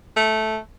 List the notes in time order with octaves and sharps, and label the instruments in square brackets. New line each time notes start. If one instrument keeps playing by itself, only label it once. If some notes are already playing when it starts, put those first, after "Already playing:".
[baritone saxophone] A3